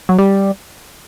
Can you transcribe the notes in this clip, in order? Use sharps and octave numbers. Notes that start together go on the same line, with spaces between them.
F#3
G3